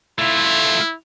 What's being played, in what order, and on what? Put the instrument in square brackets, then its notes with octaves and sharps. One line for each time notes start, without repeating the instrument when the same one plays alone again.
[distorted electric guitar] A3 F4 [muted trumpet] E4